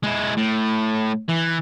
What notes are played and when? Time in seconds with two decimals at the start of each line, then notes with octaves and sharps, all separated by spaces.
0.04 G#3 E4
0.38 A2
1.28 E3